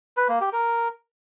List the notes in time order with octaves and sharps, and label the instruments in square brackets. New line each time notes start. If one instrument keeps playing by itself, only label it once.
[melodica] B4
A#3
G4
A#4